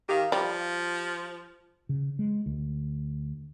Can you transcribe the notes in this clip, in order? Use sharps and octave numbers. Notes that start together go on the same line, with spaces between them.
D#3 G4 F5
F3 G3
C#3
G#3
D2